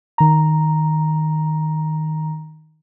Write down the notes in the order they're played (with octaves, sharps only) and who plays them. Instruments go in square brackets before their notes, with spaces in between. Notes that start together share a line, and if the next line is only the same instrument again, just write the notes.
[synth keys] D#3 A#5